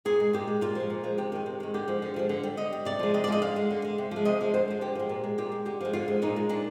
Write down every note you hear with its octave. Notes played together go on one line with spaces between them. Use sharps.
A#2 G#4
G#3
A#2 G4
G#3
A#2 F4
F3 G#3
A#2
F3 G#3
C3 G4
D#3 G#3
C3
D#3 G#3
D3 G4
F3 G#3
D3
F3 G#3
D3
G3
D3 D#5
G3
C3 D5
F3 G#3
C3 D#5
D5
F3 G#3 D#5
D3 F5
G#3
D3
G#3
C3
F3 G#3
C3 D#5
F3 G#3
D3 C5
F3 G#3
D3 G4
F3 G#3
A#2
G#3
A#2 G4
G#3
D3 G4
F3 G#3
D3 F4
F3 G#3
A#2 D#4
G#3
A#2 D4